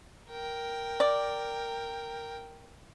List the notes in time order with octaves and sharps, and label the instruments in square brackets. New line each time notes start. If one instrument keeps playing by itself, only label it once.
[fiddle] A#4 G5
[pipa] D5